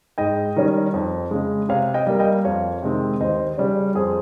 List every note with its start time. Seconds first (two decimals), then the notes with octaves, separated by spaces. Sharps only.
0.18 G#2 D#5 G5
0.56 D#3 G3 C#4
0.94 F2
1.31 C#3 G#3
1.69 C3 C#5 F5
1.94 D#5 G5
2.07 G3 A#3
2.19 D#5 G5
2.45 F2 C#5 F5
2.82 C3 D#3 G#3 C4
3.20 D#2 C5 D#5
3.58 C#3 G3 C#4
3.95 F2 G#4 C5